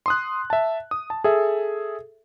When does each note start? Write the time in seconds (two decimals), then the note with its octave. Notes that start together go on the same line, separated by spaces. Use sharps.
0.06 C6 D#6 F#6
0.50 E5 A5
0.91 D#6
1.10 A5
1.24 G#4 A4 E5